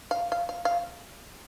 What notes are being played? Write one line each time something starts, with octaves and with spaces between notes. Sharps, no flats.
F5
F5
F5
F5